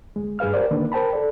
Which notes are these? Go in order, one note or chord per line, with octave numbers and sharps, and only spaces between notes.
D2 G#3
G2 G#4 B4 F5 F6
G4 A#4 C5 D5
D3 D#3 A#3 D4 B4
A#4 C5 G5 A5 B5
A4 D5